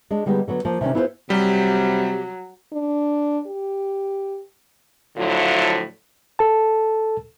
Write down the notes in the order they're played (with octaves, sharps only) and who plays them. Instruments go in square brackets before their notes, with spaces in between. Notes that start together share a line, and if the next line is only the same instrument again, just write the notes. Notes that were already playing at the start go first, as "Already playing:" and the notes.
[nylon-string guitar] G#3 D4
D3 G3 G#3 B3 D#4
D3 F#3 B3
F3 A#3
C3 D#3 C#4 D4
B3 E4 F4 G#4 A#4 C5
[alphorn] C3 [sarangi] F#3 [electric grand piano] G3 [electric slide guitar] G4
[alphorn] D4
G4
[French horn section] A2 D3 F3 F#3 E4 F4
[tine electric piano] A4 A5